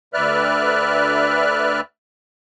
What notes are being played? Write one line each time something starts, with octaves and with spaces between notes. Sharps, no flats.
D2 B4 D5 E5 F6 F#6